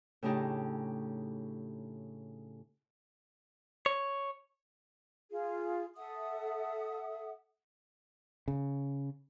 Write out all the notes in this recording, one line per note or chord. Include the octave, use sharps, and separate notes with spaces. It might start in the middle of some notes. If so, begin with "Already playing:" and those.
A2 C#3 D4 D#4 G4
C#5
F4 G#4
A4 E5 F#5 D#6
C#3